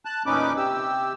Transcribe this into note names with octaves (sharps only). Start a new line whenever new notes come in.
A5 F#6
E2 A#2 C#4 D#4 B4 D6
C3 G4 E6